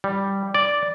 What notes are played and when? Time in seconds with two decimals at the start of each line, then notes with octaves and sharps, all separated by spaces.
0.04 G3
0.54 D5